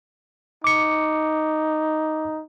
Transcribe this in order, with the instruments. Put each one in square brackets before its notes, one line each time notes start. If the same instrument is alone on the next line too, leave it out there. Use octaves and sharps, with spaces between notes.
[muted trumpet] D#4 [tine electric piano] D6 C#7